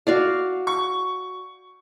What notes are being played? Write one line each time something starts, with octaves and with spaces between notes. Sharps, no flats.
F#4 D5 F5
C#6